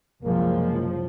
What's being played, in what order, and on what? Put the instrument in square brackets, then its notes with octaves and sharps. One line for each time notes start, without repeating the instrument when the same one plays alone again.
[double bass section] F#1 C2 F3 [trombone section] G#3 A#3